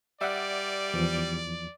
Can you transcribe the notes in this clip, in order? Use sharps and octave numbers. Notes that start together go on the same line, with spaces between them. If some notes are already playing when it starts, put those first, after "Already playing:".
G3 D5 E5 F#5
E2 F3